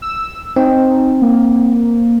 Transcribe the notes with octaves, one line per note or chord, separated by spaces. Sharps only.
E6
C4 D#4
A#3